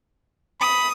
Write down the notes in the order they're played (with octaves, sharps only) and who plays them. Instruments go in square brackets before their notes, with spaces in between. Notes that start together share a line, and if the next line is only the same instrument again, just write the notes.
[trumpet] B5 [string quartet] D#6